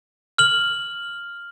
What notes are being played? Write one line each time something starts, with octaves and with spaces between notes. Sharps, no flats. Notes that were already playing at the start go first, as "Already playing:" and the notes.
F6 F#7